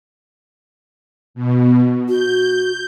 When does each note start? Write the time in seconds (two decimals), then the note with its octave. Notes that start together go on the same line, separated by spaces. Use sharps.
1.34 B2
2.08 F#4 G6